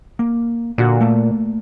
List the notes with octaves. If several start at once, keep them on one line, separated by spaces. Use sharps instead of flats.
A#3
A#2 D3 F#4
A3 A#3 A5